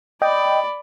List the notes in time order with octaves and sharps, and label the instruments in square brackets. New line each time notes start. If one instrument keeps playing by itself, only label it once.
[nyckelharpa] D5 B5 [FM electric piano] D#5 G5